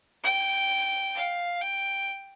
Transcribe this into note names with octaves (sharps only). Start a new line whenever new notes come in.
G5
F5
G5